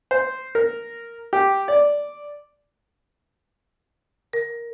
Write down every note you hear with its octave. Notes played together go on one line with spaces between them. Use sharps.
C5
A#4
G4
D5
A#4